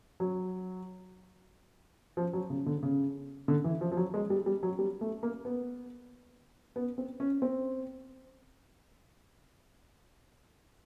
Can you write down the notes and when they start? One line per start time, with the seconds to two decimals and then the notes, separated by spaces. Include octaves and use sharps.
0.20 F#3
2.17 F3
2.33 F#3
2.50 C#3
2.66 D3
2.83 C#3
3.48 D3
3.64 E3
3.81 F3
3.92 F3
3.97 F#3
4.14 G#3
4.30 G3
4.46 G3
4.63 F#3
4.79 G3
5.01 A3
5.23 A#3
5.45 B3
6.76 B3
6.98 C4
7.20 C#4
7.42 C4